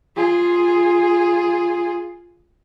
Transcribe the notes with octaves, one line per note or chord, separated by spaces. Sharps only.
F4 G#4